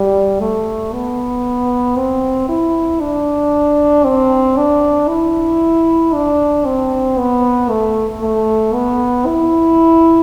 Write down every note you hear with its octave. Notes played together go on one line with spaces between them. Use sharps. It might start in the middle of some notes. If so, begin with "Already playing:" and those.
Already playing: G3
A3
B3
C4
E4
D4
C4
D4
E4
D4
C4
B3
A3
A3
B3
E4